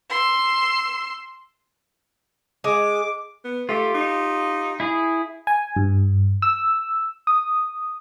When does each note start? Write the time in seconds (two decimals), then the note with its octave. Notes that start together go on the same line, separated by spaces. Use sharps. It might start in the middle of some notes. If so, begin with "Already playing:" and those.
0.10 C6 E6
2.64 G#3 D6
3.44 B3
3.69 A3 F4 G4
3.94 D#4
4.80 E4 G#4
5.47 G#5
5.76 G2
6.42 E6
7.27 D#6